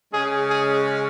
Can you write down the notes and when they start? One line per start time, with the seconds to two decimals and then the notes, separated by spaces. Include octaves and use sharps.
0.12 C#3 G#3 C#4 G#4
0.49 G#4